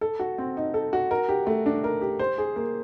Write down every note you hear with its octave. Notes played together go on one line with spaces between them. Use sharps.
A4
F#4
C4
D#4
A4
F#4
A#4
G4
A3
D4
A#4
G4
C5
G#4
A#3